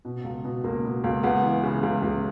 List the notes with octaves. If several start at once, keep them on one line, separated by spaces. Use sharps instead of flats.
B2
C#2
B2
C#2 A#3
B2
C#2
C#2 B3
E3
C#3
C#2
C#2